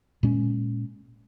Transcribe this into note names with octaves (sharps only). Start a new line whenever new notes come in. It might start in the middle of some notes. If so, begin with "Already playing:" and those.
A#2 G#3 C#4